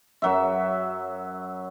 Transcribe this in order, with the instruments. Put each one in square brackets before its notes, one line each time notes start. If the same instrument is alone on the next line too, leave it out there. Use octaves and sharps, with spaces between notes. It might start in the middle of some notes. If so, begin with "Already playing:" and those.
[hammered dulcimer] F#2 F#3 E5